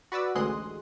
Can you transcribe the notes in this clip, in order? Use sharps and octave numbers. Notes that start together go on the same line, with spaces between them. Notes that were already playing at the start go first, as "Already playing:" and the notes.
F#4 B4 D5 D6 E6
A1 D2 G#3 C6 D#6 F#6